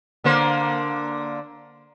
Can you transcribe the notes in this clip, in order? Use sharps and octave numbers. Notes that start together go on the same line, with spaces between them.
D3 A#3 C5